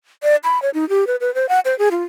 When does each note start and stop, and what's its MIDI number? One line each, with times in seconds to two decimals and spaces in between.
0.23 0.36 74
0.44 0.61 83
0.62 0.70 73
0.74 0.88 63
0.89 1.07 67
1.07 1.16 71
1.21 1.34 71
1.34 1.48 72
1.49 1.60 78
1.65 1.77 72
1.79 1.89 68
1.91 2.03 65